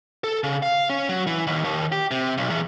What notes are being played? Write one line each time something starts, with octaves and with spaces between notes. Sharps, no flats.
A4
C#3
F5
C#4
F#3
E3
D#2
D#2
G4
C3
B1
E2